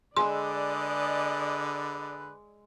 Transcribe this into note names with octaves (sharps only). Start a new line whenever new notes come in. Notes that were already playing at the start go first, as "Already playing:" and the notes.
D3 G#3 B4 D5 D#5 G#5 C6 E6